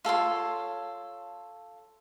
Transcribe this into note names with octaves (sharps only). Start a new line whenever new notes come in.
F4 A4 C#5 C6